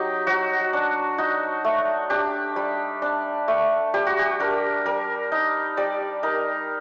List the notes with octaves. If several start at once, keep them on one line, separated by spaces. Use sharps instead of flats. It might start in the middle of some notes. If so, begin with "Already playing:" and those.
Already playing: F#3 D#4 G4
F#3 F#4
D4
D#4 F#4
A3
D4 G4
G3
D4
A3
G3 G4
F#4
G4
D4 A#4
G3 A#4
D#4
G3 D5
D#4 A#4